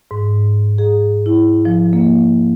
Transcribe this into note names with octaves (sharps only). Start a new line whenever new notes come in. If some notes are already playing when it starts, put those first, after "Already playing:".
G#2
G#4
E4
F3
A#3